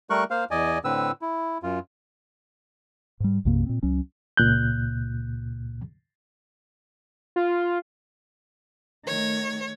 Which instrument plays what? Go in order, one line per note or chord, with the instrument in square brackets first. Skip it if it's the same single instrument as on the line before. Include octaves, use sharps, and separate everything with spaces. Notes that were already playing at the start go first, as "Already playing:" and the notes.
[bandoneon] G3 A3 A#4 C#6 F#6
A#3 C5 F5
E2 D5 D#5 G#5
A2 D3 C4 B4 E6
E4
F#2 F4
[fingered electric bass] G#2 G3
B1 F#2 C3 A#3
A#2 C4
C#2 F#3 C#4
[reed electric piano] C#2 A#2 F#6 G6
[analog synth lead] F4
[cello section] D#3 A3 [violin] C#5